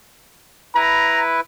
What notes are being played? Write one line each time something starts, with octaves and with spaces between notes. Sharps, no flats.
E4 B4 A#5